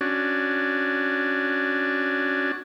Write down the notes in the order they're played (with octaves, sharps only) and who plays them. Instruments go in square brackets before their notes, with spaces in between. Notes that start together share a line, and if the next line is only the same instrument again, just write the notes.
[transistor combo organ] C#4 D4 F#4